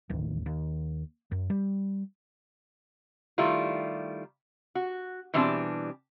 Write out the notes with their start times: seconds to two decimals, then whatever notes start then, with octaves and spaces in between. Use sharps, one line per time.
0.10 D1 A1 D#2
0.46 D#2
1.31 F#2
1.50 G3
3.38 D#3 G3 A3 E4 F4
4.75 F#4
5.34 B2 E3 G3 C4 D4 A5